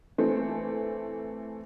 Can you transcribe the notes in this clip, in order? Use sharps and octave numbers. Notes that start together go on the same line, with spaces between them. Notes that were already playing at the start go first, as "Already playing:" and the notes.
E3 A3 C4